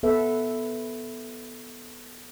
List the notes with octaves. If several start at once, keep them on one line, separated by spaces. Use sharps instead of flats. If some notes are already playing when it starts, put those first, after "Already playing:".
B3 A4 B4 E5